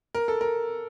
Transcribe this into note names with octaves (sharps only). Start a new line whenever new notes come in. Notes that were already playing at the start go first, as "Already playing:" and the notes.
A#4
A4
A#4